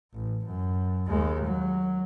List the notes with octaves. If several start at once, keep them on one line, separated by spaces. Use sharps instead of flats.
A1
F#2
D#2 G#3
F#3